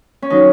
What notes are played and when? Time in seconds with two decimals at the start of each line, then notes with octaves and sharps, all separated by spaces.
0.22 C#4
0.30 D#3 F#3 D#4